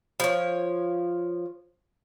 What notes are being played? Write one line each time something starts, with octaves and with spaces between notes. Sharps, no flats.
F3 C#5